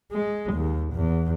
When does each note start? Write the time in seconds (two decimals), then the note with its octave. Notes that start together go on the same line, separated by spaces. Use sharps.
0.12 G#3
0.53 D#2
0.94 E2